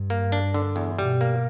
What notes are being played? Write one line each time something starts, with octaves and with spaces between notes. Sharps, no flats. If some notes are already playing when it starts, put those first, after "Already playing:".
Already playing: G2
A#3
D4
D3
E2
B2 G3
A#3